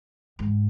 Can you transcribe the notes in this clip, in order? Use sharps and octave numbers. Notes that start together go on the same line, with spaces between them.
G#2